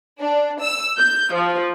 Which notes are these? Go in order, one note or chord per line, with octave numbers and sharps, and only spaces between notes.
D4
E6
G6
F3